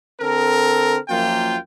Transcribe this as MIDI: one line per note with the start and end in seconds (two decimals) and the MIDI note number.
0.21 0.98 50
0.21 0.98 60
0.21 0.98 69
0.21 0.98 70
1.09 1.57 42
1.09 1.57 53
1.09 1.57 58
1.09 1.57 65
1.09 1.57 79